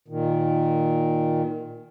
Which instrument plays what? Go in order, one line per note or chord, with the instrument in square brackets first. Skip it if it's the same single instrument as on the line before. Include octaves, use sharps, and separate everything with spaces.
[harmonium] A#2 D#3